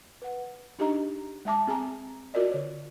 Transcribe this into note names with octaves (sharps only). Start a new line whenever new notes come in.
B4 F#5
D4 D#4 G4 G#4 D#5 A#5
G#3 E5 A5 D6
C4 G#4 G#5 A#5
F4 F#4 A#4 D5 D#5
D3 C#5